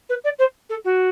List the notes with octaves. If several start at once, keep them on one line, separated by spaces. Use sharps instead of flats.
B4
D5
C5
A4
F#4